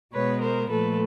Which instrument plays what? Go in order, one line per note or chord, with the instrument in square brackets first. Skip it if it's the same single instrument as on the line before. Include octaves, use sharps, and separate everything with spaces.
[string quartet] B2 G#3 B3 B4 C#5
A#4 C5
A#2 F3 A3 A4 B4